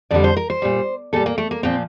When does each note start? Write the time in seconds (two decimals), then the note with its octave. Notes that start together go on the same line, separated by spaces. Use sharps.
0.11 F2 D3 G3 D5
0.24 C5
0.37 A#4
0.50 C5
0.62 A#2 G3
1.13 A#2 G3 A4
1.26 A#3
1.38 A3
1.51 A#3
1.63 A#2 F3 C4